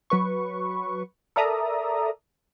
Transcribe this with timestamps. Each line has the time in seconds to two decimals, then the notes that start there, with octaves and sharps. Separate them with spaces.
0.10 F#3 B4 C#6
1.36 A4 A#4 D5 E5 A#5 D#6